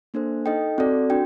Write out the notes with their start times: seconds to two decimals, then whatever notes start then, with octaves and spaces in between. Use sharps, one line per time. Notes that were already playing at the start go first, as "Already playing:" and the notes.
0.14 A#3 D4 A4 C5
0.46 D#4 A4 D#5 G5
0.78 C4 F#4 A4 D5
1.10 D4 F#4 G5